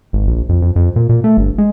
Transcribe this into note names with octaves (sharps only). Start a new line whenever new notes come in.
G#1
A#1
F2
F2
F2
A#2
A#2
A3
G1
G#3